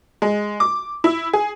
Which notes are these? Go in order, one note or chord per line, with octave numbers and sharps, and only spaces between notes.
G#3
D6
E4
G#4